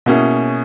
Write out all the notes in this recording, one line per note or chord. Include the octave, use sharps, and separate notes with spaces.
B2 A#3 C#4 E4 G#4